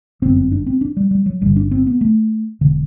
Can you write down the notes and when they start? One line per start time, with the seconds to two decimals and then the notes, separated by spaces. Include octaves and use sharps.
0.22 G1 F#2 D3 C4
0.36 C4
0.52 D4
0.67 C4
0.81 D4
0.97 G3
1.11 G3
1.26 F#3
1.41 G1 G2 D3 G3
1.56 D4
1.71 C4
1.87 B3
2.01 A3
2.61 E1 D3